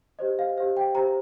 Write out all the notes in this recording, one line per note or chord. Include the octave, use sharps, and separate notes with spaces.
G4 C5 D#5
F5
G4 C5 F5
G5
G4 C5 A#5